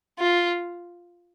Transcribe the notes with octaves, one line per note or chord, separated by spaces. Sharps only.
F4